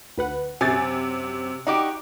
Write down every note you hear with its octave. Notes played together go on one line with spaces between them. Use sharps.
D2 B4 F#5
F#2 C3 G#5 A6
D#4 F#4 G4 D5 D6